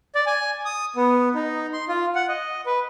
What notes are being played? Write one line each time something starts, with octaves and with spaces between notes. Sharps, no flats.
D5
G#5
D#6
B3
D#4
C6
F4
F#5
D#5
B4